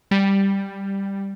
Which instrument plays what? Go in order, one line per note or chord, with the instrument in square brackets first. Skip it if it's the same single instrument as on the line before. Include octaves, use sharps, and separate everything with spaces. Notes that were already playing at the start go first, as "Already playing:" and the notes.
[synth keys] G3